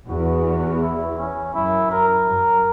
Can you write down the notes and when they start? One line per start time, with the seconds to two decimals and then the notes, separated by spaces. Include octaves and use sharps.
0.08 E2 F#4
0.81 E4
1.18 C#4
1.54 F#2 E4
1.91 A#4
2.27 F#2